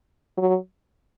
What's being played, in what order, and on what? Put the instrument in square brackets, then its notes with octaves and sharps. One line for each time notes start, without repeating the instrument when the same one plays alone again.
[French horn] F#3